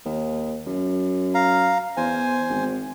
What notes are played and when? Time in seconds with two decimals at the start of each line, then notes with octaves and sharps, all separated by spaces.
0.05 D#2
0.66 F#2
1.34 F5 A#5
1.97 E2 C5 G#5
2.49 G#1